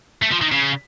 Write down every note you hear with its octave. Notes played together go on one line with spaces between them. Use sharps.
A3
F3
D#3
C#3